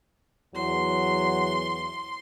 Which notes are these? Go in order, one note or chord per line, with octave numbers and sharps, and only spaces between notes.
E2 F#3 C6